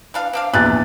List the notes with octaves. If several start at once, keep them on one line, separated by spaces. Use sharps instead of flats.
E3 D4 F5
C4 D4 F5
A#1 E2 D3 G3 G#4 F#6 A6